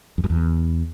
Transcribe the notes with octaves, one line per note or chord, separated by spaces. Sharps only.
F2
F#2
E2